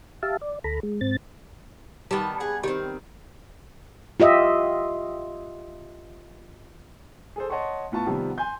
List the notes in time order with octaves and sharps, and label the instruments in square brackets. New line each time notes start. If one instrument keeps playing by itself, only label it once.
[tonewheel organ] G4 E5 F5 A5
D5
D2 A4 A#5 B5
G#3
G#2 C4 A6
[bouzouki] D#3 A5 [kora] G3 B3
[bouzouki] G#4 F#5
[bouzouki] D#3 C4 [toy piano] G4
[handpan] F4 G4 D#5 E5
[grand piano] G#4 A4 C5
C#5 D#5 F#5 A5 C6 C#6
A2 B3 F4 A5 C#6
C3 D#3 F3 G3 B3
G#5 C6 G6